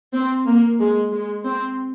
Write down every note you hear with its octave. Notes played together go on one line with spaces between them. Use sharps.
C4
A#3
G#3
G#3
C4